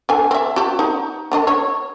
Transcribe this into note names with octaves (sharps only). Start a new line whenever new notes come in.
D3 G#5
C4 E5
F#4 G4
D#4
D3 D4 D#5
C#5